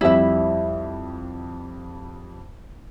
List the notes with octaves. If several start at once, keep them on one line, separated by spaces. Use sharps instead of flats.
F2 G3 E4 E5 F#7